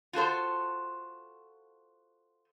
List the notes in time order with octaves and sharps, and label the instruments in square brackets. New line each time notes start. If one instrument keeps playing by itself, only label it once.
[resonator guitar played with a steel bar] F4 F#4 A4 C5